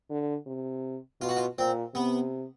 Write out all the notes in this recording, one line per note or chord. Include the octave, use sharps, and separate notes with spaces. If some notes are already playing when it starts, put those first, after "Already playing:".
D3
C3
B2 F4
F#4
F4
A#2 C4
C3 B3